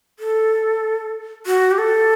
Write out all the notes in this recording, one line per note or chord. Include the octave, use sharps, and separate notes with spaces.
A4
F#4
G4
A4